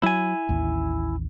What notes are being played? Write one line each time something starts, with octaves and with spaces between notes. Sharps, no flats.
F#3 E4 G#5
A1 D#2